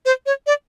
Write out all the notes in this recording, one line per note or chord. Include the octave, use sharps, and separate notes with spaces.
C5
C#5
D5